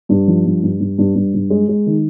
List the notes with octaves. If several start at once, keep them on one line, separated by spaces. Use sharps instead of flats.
G2
F3
G2
G2
G2
G2
G2
G2
G#3
G#3
D#3